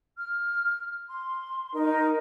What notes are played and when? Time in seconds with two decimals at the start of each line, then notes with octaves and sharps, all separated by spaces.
0.18 F6
1.09 C6
1.74 D#4 A#4